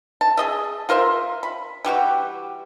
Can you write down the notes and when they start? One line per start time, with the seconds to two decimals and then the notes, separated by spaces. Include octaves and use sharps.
0.21 A5
0.37 G#4 D#5 E5
0.89 F4 A#4 C5 E5
1.43 B5
1.85 E3 G3 F#4 G4